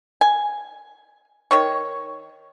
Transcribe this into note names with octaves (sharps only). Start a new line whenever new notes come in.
G#5
D#3 C#5 C#6